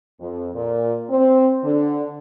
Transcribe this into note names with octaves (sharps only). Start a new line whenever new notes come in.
F2
A#2
C4
D3